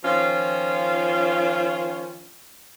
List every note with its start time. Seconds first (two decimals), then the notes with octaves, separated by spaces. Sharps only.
0.05 D#3 F3 C#4 F4